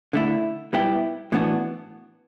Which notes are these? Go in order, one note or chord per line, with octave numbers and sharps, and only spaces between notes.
D3 A3 E4
G3 B3 E4 G4
A2 E3 B3 D4 F#4